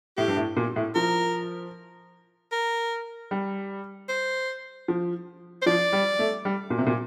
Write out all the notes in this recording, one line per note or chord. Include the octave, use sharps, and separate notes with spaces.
A2 G4
G2
A2
A#2
A2
F3 A#4
A#4
G3
C5
F3
C5
F3 D5
G3
A3
G3
A#2
C3
A#2